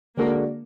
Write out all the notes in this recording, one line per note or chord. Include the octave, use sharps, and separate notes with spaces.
D3 G#3 A#3 D4 F#4 A#4